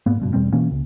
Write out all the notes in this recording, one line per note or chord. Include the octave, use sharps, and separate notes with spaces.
G#2 A#3 B3
F#1 G2 B2
E2 B2 G3 C4
B2 E3 A#3 C#4
C#2